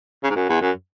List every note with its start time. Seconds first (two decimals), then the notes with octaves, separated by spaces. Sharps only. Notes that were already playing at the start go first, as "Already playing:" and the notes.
0.23 C#3
0.30 G#2
0.36 F#2
0.49 E2
0.62 F#2